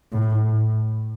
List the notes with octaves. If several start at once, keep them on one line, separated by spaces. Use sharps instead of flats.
A2